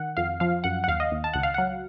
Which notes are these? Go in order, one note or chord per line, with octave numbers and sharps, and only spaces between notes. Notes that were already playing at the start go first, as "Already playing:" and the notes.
Already playing: D#3 F#5
F2 F5
F3 F5
F#2 F#5
F#5
D#2 F5
D#5
D#2
A5
C#2 F#5
F5
F#3 F#5